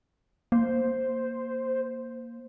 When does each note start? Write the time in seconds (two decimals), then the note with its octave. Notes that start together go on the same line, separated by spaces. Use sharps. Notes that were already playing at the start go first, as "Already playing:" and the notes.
0.52 A#3 C5